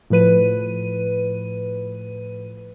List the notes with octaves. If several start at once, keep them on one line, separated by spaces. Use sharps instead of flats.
A2 F3 B4 D#7